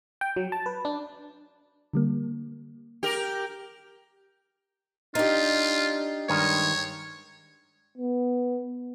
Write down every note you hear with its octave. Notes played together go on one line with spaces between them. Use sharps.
G5
F#3
A5
B4
D4
D3 G3 A#3
G4 A#4
D4 D#4 F4 G4
G2 D#3 G#3 C#5
B3